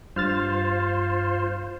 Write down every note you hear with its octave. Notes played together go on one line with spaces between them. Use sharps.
G2 F4 C5 F6 A6